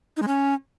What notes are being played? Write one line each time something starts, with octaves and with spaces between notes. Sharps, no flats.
D#4
G#3
C#4